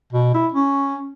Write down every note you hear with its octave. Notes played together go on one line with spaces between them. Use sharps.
B2
E4
C#4